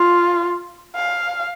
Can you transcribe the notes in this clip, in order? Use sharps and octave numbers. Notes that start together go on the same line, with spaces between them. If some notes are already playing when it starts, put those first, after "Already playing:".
Already playing: F4
F5